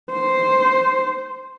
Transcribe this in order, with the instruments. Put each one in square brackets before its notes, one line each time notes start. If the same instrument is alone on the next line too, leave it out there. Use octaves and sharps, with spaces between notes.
[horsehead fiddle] C5